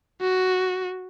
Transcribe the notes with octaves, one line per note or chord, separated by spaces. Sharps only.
F#4